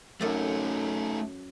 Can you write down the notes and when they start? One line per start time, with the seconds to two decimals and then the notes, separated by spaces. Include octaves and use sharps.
0.21 F#2 A3 D#4 A4